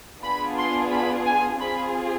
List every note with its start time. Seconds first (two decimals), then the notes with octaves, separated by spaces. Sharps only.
0.23 B3 D4 F4 G#4 B5
0.58 C6
0.92 B5
1.26 G#5
1.60 C4 F4 G#4 B5